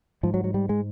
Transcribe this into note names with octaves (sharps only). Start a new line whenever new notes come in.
G#2 F3
F#3
F#3
G3
G#3